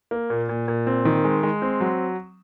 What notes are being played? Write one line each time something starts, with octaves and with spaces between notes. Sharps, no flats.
A#3
A#2
A#2
A#2
C4
D#3
G#3
G#3
C4
F#3